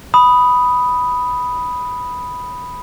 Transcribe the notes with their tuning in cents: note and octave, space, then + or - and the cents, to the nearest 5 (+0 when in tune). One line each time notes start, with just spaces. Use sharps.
B5 +0 D#6 +0